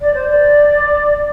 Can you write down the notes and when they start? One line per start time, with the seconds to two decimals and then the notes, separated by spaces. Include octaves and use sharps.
0.01 D5
0.14 C5
0.27 D5